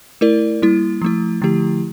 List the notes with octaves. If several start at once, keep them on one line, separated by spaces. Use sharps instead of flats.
A3 E4 A#4 D5
G3 A#3 E4
F3 A3 E4
D3 F3 A3 E4 G4